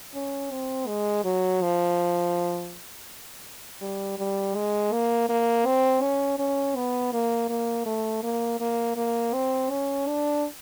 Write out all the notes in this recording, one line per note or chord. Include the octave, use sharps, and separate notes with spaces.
C#4
C4
G#3
F#3
F3
G3
G3
G#3
A#3
A#3
C4
C#4
C#4
B3
A#3
A#3
A3
A#3
A#3
A#3
C4
C#4
D4